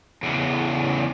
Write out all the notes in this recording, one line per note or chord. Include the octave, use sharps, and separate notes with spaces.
E2 C#3